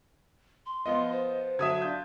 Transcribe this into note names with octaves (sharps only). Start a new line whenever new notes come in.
C6
F3 B3 F4 D#5
C5
D3 F#3 E5 D#6 G#6
D4 F4 G6